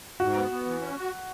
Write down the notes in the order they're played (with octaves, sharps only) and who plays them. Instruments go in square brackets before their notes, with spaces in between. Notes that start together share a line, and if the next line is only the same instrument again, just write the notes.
[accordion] G#2 [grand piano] F#4
[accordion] B3
B3
E3
C#4
F#4